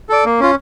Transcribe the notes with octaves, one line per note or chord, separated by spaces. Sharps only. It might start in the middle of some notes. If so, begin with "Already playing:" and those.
A4 D5
A#3
C#4 F4